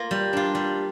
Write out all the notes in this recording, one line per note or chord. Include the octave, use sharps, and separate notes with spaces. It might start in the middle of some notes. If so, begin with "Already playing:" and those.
Already playing: A#3 F4
G3
D4 F4
G3